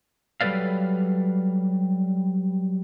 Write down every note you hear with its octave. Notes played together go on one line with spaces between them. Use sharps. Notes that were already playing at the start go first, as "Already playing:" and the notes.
F#3 G3 A4 B4 D5 F5